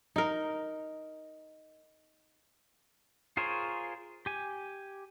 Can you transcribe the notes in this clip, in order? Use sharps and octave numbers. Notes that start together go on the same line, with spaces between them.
D#4 A#4
F4 G#4 A#4 C5 C#5
G4 G#5